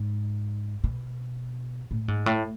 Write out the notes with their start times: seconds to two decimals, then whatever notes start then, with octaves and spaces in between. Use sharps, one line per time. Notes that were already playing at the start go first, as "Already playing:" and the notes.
Already playing: G#2
0.84 B2
1.91 A2
2.08 G#2
2.26 A2